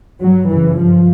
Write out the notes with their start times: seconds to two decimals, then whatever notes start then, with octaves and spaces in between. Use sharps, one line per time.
0.20 G2 F#3
0.49 F#2 C#3 E3
0.78 G2 F3